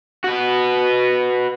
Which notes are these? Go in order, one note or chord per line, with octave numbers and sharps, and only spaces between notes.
F#4 B4